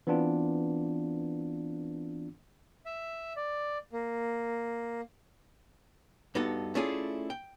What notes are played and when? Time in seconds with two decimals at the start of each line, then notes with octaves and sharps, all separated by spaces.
0.07 E3 B3 C4 D4 F4
2.86 E5
3.36 D5
3.92 A#3
6.35 G2 B3 D#4 F#4 A4
6.75 A3 C#4 D4 E4 F4 G#4
7.30 G5